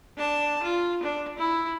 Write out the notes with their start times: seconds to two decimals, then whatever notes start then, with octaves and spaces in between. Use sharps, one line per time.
0.17 D4 A5
0.62 F4
1.03 D4
1.38 E4